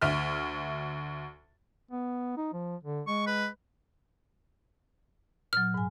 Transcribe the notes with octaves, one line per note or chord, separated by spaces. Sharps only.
D2 E5 F6
B3
D#4
F3
D3
G#3 C#6
B4
A#2 F#3 F6
G#2 G#5